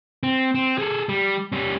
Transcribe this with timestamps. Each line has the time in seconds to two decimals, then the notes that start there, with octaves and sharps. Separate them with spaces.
0.23 C4
0.55 C4
0.78 G#4 A4
1.09 G3
1.52 G3 C#4